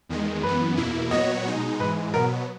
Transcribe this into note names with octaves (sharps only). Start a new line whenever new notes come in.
E2 D#3 G#3
F#2 E3 B3 B4
E2 B2 A#3 E4
A#2 F#3 B3 F#4 C#5 D#5
B2 G#3 D#4
G#2 E3 G#3 B4
B2 F#3 B3 A#4